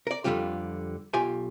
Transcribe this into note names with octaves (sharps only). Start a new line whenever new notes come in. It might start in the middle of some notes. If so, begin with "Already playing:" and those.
A#4 D5
F2 G#2 D3 G3 F4 G4
B1 F4 G4 G5 G#5